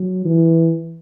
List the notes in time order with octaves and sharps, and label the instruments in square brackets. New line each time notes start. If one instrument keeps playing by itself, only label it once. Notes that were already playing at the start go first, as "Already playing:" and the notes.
Already playing: [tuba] F#3
E3